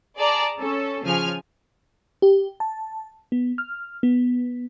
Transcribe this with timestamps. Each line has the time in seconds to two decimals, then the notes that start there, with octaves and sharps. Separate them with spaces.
0.18 G#4 D5 A5 A#5
0.58 C#4 A4
1.04 C#3 F3 G#5 F6
2.22 G4
2.60 A5
3.32 B3
3.58 F6
4.03 B3